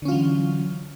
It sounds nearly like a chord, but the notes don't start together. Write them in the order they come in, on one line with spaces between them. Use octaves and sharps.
D3 C#4 F4 F#3 E3